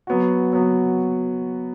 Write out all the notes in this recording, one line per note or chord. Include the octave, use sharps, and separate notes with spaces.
F#3 B3 F#4
F#3 B3 F#4